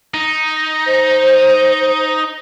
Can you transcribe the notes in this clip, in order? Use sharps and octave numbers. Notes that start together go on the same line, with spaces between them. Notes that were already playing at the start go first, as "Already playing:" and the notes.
D#4
C5